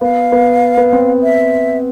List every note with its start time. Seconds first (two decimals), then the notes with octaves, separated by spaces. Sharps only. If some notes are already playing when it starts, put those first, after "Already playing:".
0.01 B3 F5
0.32 B3
0.77 B3
0.92 C4
1.23 E5